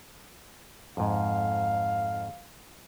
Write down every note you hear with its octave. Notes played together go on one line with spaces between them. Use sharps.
F2 G#2 F5